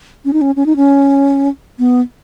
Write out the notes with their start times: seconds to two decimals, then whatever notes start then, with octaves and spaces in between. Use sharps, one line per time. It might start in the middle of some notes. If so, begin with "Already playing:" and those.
0.25 C#4
0.33 D#4
0.41 C#4
0.56 C#4
0.66 D#4
0.76 C#4
1.79 B3